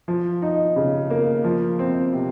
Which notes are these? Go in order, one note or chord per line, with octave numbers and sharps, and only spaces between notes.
F3
D#4
C#3
A#3
F3
C4
C3